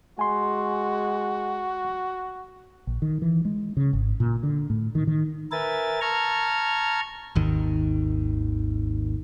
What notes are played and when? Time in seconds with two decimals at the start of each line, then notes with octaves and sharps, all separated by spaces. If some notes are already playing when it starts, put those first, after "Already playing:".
0.19 G#3 F#4 G#5 C6
2.87 A#1
3.02 D#3
3.22 E3
3.45 G#3
3.77 C#3
3.93 G#1
4.20 A#2
4.43 D3
4.70 A2
4.95 D#3
5.07 D#3
5.52 A#4 B4 E5 G#5 A6
6.01 A5 A#5 C#6 F6 G#6
7.35 G#1 D#2 D#3